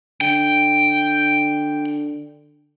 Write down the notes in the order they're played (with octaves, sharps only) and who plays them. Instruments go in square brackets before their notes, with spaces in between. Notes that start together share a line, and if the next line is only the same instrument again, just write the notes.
[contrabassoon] D3 [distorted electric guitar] G5